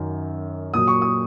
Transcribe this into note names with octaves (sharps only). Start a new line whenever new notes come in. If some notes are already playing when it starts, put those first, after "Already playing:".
Already playing: F#2 D#3 F#3
A#2 F#3 D#6
C#6
D#6